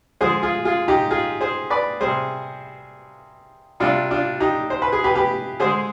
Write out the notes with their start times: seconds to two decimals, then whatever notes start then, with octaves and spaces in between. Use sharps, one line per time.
0.21 D3 F3 G#3 G#4 C5
0.43 F4 G#4
0.65 F4 G#4
0.88 D#4 G4
1.10 F4 G#4
1.41 G#4 C5
1.70 B4 D5
2.01 C3 G3 G#4 C5
3.80 C3 G3 D4 F4
4.11 D4 F4
4.40 D#4 G4
4.70 C5
4.82 B4
4.92 G#4
5.04 G4 B4
5.15 G4 B4
5.60 D3 G#3 G#4 C5